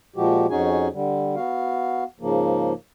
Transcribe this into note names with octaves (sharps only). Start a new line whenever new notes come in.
A#2 F3 G#3 F#4 G4
F2 C#4 D#4 F#4 G#4 G#5
D3 G3
B3 F#4 F5
G#2 C#3 F3 A#3